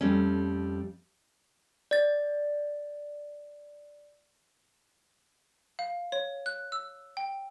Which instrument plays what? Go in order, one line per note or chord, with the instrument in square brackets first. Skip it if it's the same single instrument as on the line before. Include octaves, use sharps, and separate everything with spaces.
[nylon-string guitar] F2 G3 A3 C#4
[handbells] D5 A6
[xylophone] F5
C#5
F#6
E6
G5